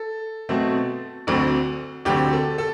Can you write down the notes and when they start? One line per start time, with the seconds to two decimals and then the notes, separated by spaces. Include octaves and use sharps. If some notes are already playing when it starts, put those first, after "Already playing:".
Already playing: A4
0.49 B2 F#3 A3 C4
1.27 D2 D3 F#3 C4
2.05 D2 D3 F#3 C4 G4
2.33 A4
2.58 A4